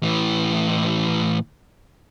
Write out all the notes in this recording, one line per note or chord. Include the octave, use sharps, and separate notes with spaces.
A2 E3